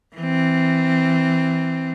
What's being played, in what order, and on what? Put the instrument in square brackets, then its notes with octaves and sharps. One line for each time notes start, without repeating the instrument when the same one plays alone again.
[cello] E3 C4